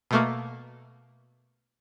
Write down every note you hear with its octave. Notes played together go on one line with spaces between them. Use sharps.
B2 A3 A#3